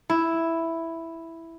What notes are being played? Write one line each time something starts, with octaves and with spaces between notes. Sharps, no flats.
E4